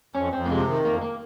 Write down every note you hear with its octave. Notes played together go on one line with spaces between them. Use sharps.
F2 C#4
F2 C4
A#3
C3 G#3
D#3
F2 A#3
A#3